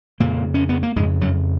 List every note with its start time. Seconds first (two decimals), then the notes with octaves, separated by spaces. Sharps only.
0.20 F2 A#2 C#3 A#3
0.54 C#4
0.69 B3
0.83 A#3
0.96 F2 G#2 G#3
0.99 C#3
1.21 F#2 F#3